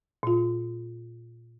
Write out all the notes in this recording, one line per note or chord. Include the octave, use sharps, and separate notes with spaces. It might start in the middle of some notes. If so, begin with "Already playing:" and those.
A#2 F4